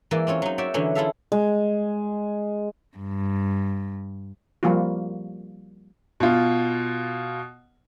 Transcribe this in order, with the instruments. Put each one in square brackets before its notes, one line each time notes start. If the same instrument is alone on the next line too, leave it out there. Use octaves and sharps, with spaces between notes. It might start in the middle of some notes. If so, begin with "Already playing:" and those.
[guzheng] E3 G#3 A#3 D5
C4 C#4 F4 C#5
F#3 D#4
F#4 C#5 D5 E5 G5
D3 E3 F#3 C#4
E4 F4 G#4 A4 E5 F5
[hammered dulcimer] G#3
[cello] G2
[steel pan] F3 G3 A#3 F4 F#4
[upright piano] B2 F4